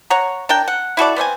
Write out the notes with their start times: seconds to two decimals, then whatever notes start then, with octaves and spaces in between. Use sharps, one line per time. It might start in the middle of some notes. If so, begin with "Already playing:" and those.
0.10 C#5 F#5 A#5
0.49 D4 A#4 G5
0.68 F#5
0.97 E4 F#4 A4 D5
1.16 B3 C4 E5 G#5